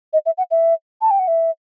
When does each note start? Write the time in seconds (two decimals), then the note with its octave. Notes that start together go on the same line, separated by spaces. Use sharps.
0.13 D#5
0.26 E5
0.38 F#5
0.51 E5
1.01 A5
1.11 G5
1.19 F#5
1.28 E5